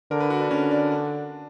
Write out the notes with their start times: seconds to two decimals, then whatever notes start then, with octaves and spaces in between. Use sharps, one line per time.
0.11 D3 A#4
0.20 B4
0.30 F#4
0.41 D4
0.51 D3 C#4
0.71 D4
0.92 D4